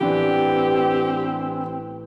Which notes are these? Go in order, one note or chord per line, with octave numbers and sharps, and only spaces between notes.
A1 E3 B3 C4 D4 G4